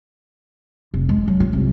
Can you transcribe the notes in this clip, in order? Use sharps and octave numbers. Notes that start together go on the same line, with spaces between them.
F1
G#3
F#3
F4
C2